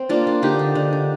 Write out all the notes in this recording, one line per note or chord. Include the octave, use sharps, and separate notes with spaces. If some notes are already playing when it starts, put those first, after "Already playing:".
Already playing: C4
A#3 D4 F4
A#3
D3 D#4 G4
D3
D3
D3